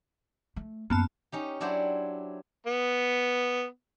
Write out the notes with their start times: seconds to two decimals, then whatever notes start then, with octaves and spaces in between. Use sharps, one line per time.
0.56 A3
0.90 F#2 A#3 B3 A5
1.32 C#4 D#4 G4
1.60 F#3 D4 E4 G4 C5 F#5
2.66 B3